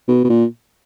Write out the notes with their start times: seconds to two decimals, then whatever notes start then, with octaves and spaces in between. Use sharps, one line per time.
0.08 B2
0.24 B2
0.30 A#2